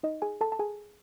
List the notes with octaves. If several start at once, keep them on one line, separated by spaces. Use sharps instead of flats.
D#4 D#5
G#4 G#5
A4 A5
A5
G#4 G#5